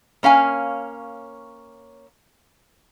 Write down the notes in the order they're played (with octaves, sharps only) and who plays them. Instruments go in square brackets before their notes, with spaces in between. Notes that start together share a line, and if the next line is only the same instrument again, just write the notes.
[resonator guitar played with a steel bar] A#3 C#4 F5 G#5